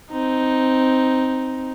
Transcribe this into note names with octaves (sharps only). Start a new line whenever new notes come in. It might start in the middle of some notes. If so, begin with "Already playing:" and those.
C4 D#4